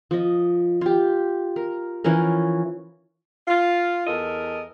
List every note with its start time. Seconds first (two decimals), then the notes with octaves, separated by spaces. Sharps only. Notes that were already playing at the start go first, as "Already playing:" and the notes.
0.11 F3 D#5
0.81 F4 G4
1.56 A#4
2.04 E3 F3 C#4 A#4
3.48 F4
4.07 E2 A4 A#4 D#5